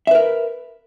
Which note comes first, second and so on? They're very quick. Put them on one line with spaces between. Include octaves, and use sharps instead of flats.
E5 B4 A#4